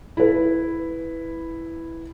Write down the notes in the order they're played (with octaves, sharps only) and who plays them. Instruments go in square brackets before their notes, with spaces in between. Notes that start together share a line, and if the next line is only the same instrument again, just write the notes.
[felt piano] E4 B4